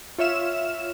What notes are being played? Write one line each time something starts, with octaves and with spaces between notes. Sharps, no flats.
F4 C#5 E5 F6 E7